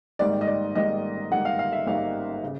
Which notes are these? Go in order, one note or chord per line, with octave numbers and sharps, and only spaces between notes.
G#1 G#2 D#3 G3 A#3 D5
D#5
D5
G#1 G#2 D#3 G3 A#3 D#5
G#1 G#2 D#3 G3 A#3 F#5
F5
F5
E5
G#1 G#2 D#3 G3 A#3 F5
C#3